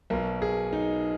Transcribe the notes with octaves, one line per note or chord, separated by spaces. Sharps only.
B1 B2 A#4
G#4
D#4